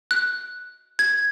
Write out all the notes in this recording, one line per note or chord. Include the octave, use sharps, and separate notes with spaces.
F#6
G#6